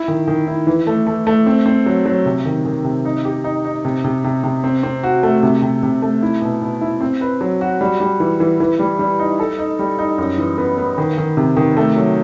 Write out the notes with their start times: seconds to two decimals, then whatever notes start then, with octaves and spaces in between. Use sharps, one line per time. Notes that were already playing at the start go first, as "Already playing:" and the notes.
Already playing: E4
0.08 D#3
0.28 D#3
0.48 E4
0.67 E3
0.87 A3
1.07 A3
1.27 A3
1.46 C4
1.66 C4
1.86 F#3
2.06 F#3
2.26 C3
2.45 D#3
2.65 D#3
2.84 C3
3.05 D#4
3.25 G4
3.44 D#4
3.65 D#4
3.85 C3
4.04 C3
4.24 C3
4.44 C3
4.64 C4
4.83 C4
5.03 F#4
5.23 A3
5.43 C3
5.62 C3
5.83 C3
6.02 A3
6.23 E4
6.42 B2
6.62 B2
6.81 E4
7.01 C4
7.21 B4
7.41 F#3
7.61 F#4
7.81 G3
8.00 G3
8.20 E3
8.40 E3
8.60 E3
8.79 G3
8.99 G3
9.19 D#4
9.40 A4
9.58 D#4
9.79 G3
9.99 D#4
10.18 F#2
10.38 E3
10.58 B3
10.77 B3
10.98 D#3
11.18 D#3
11.37 C3
11.57 D#3
11.77 A3
11.96 F#3